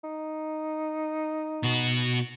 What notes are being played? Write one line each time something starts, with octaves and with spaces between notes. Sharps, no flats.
D#4
B2 F#4